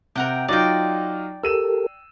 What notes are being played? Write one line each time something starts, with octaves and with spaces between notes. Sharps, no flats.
C3 A#4 F#5 G5
F#3 D#4 F4 D5 G5
G4 A4 A#4 E6 D#7 E7